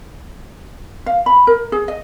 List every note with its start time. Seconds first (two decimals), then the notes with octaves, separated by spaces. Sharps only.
1.06 F5
1.26 B5
1.47 A#4
1.72 G#4
1.88 D#5